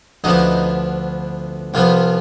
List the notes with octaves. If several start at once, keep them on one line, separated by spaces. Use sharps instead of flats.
D2 D3 F3 B3 D#4
C2 C3 F3 B3 F4